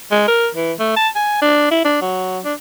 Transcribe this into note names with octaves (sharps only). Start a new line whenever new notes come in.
G#3
A#4
E3
A3
A5
G#5
D4
E4
D4
F#3
D4